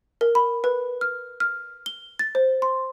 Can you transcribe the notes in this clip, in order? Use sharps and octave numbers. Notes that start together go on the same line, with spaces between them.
A#4
B5
B4
F6
F6
G7
A6
C5
C6